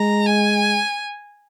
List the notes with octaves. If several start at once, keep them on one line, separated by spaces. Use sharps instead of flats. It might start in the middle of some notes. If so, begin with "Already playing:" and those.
Already playing: G#3 A#5
G#5